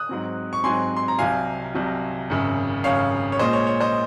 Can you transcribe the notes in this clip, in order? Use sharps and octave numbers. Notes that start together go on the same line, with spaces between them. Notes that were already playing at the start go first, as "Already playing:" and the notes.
Already playing: D#6 F#6
G#2 F#3 C4
C#6
G#2 F#3 C4 G#5 C6
C6
A#5
C2 C3 F#3 F5 G#5
C2 C3 F#3
G#1 F#2 C#3
G#1 F#2 C#3 C#5 F5
C#5
A#1 A#2 G#3 C5 D#5
C#5
C#5
C5 D#5